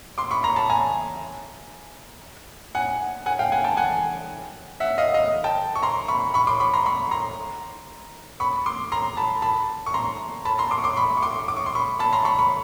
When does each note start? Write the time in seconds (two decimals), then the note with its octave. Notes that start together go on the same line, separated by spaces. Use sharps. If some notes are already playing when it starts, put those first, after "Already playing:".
0.18 C6 D6
0.31 B5 C#6
0.43 A#5 C6
0.56 A5 B5
0.70 G#5 A#5
2.75 F#5 G#5
3.26 F#5 G#5
3.39 F5 G5
3.52 F#5 G#5
3.64 G5 A5
3.77 F#5 G#5
4.80 E5 F#5
4.98 D#5 F5
5.14 D#5 F5
5.44 G5 A5
5.75 C#6
5.83 A#5 C6
6.08 B5 C#6
6.34 B5 C#6
6.47 C6 D6
6.60 B5 C#6
6.74 A#5 C6
6.86 B5 C#6
7.11 A#5 C6
8.40 B5 C#6
8.66 C6 D6
8.92 A#5 C6
9.17 A5 B5
9.42 A5 B5
9.86 C#6
9.94 A#5 C6
10.45 A5 B5
10.58 A#5 C6
10.71 C6 D6
10.78 C#6
10.84 C6 D6
10.97 B5 C#6
11.17 C#6
11.22 C6 D6
11.48 D6
11.57 C#6
11.66 C6
11.75 B5 C#6
11.99 A5 B5
12.13 A#5 C6
12.25 B5 C#6
12.39 B5 C#6